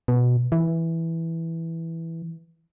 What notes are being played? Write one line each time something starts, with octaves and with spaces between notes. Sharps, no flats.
B2
E3